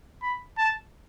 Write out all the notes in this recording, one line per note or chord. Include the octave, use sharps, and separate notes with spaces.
B5
A5